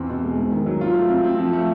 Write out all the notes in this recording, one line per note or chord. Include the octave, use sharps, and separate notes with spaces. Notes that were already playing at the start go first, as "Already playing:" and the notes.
Already playing: E2 C4
B2
G#3
G#2
D#3
F#3
F4
A3
C4
C4
F3
A3